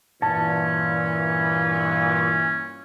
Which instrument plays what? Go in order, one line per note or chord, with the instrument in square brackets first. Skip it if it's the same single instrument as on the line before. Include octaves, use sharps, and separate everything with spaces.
[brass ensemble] G2 A#2 E3 [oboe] C#4 [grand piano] A5